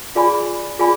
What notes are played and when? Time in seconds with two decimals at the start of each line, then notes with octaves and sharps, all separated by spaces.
0.15 F4 G#4 D5 G#5 B5
0.79 F4 G#4 D5 G#5 B5